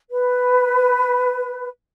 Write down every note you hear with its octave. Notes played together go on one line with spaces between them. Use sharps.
B4